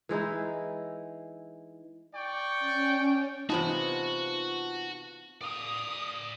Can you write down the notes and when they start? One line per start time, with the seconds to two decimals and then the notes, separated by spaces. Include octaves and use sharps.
0.09 E3 G#3 D#4 E4
2.14 D5 G5 C#6
2.59 C#4
3.49 C3 E3 B3 D#4 F4 F#4 C5 A5
5.41 D5 F5 D#6